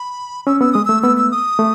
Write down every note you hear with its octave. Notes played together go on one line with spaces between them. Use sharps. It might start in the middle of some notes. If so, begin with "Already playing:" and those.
Already playing: B5
C#4 E6
B3 E6
G#3 D#6
A3 E6
B3 E6
E6
D#6
A3